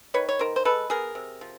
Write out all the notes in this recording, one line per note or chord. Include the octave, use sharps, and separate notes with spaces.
D#3 B4 C#5
C#5
D#3 A#4 C5
C5
G#3 A4 B4
B3 G#4 A#4
C3
F3